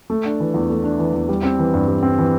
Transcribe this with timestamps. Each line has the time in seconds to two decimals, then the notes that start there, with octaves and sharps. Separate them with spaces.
0.10 A3
0.25 D4
0.40 E3
0.54 E2
0.70 A3
0.84 D4
0.99 E3
1.14 E2
1.29 G3
1.43 C4
1.59 E3
1.74 G2
1.88 G3
2.03 C4
2.18 E3